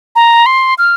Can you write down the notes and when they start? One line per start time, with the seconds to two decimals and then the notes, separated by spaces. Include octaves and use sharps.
0.16 A#5
0.46 C6
0.78 F6